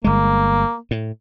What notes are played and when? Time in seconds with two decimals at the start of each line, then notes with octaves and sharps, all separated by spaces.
0.04 G1 G#3 A#3
0.91 A2